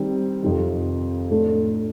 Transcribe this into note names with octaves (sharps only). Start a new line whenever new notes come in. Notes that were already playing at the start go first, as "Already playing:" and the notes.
Already playing: D#3 G3 C4 G4
F2 C3 D#3
A2 A3 D4 A4